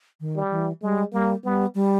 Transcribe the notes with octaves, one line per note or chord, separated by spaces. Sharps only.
D#3
G3
E3
G3 G#3
G3 A#3
G3 B3
G3